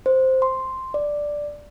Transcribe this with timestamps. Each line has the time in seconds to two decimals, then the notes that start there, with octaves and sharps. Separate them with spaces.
0.06 C5
0.42 C6
0.94 D5